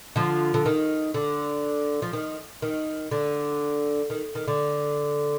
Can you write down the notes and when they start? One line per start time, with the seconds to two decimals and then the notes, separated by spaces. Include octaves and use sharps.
0.16 D3 F3
0.54 D3
0.66 D#3
1.14 D3
2.02 F3
2.13 D#3
2.62 D#3
3.11 D3
4.10 D#3
4.35 D#3
4.48 D3